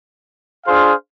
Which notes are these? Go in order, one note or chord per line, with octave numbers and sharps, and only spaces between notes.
D4 F4 G#4 C5 F5